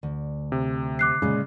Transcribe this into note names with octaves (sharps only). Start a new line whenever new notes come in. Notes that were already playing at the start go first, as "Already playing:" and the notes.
D2
C3
D6 F#6 C7
A#2 C#3 G#3